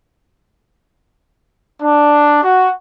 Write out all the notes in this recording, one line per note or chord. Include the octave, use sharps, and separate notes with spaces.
D4
F#4